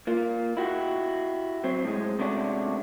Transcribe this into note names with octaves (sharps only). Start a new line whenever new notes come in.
A#3 F4
E4 F#4 G4
F#3 C4
A2 G#3
C3 G#3 A3 C#4 D4 F#4